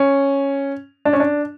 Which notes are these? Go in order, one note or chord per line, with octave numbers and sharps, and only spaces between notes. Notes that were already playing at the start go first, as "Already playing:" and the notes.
Already playing: C#4
D4
C#4
D4